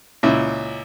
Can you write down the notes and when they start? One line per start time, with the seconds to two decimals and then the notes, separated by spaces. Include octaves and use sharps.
0.23 C#2 A#2 E4